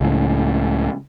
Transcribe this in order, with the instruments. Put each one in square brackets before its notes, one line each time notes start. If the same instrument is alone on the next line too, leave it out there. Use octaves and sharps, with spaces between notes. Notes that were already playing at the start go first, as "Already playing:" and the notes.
[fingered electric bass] C#2 A2